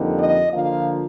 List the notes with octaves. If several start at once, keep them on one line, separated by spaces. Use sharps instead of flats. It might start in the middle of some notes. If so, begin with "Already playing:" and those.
Already playing: F2 D3 G3 A#3 D#4
D#5
D3 F3 A#3 D4 F4 F5